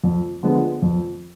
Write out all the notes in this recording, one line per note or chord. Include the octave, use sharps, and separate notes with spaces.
F2
D3 F3 G#3 B3
F2